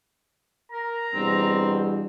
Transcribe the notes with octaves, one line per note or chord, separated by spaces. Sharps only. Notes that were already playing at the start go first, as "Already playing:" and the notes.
A#4 A#5
E2 G2 B2 C4